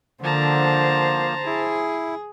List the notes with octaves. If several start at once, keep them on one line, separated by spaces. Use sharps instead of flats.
D3 F3 A#3 C5 A5 A#5
E4 G#4